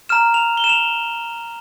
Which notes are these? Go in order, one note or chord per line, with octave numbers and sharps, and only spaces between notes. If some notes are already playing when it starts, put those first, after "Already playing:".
A#5 F6 E7
F7
G7
E7
F7